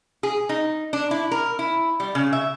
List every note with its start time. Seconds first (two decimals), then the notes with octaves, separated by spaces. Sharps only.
0.23 G#4
0.49 D#4
0.93 D4
1.11 E4
1.31 A#4
1.59 E4
2.00 G3
2.15 C#3
2.33 E5